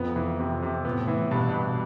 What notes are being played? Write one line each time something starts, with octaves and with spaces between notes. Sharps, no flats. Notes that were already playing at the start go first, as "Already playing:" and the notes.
Already playing: F2 B3
E3
C3
C3
A2 B3
E3
G2 B2
G2